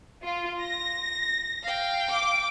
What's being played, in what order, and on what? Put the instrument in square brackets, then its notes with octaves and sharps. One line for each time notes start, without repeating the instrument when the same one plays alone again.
[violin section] F4
A#6
[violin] F5 G5
[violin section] D6